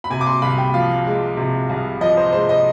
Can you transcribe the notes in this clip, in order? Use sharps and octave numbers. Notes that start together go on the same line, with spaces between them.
B5
C3 G#5
D6
C6
C2 B5
G5
F3 F5
G#3
C3
C2
F3 D#5
C5
G#3 C5
D#5